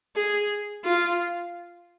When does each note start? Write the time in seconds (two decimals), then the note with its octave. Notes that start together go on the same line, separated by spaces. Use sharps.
0.16 G#4
0.84 F4